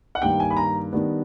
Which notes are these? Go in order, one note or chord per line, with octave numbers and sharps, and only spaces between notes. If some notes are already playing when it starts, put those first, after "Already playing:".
F#5
G2 D#3 G3 A#3 G5
G#5
B5
A#5
D#3 G3 B3 D4